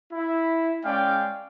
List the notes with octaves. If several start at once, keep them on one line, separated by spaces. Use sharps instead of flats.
E4
G#3 C#4 D5 F5 G5